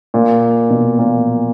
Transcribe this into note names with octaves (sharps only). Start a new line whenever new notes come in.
A#2
B2
A#2